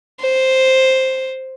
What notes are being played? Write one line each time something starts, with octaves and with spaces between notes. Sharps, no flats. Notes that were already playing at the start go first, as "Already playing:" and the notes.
C5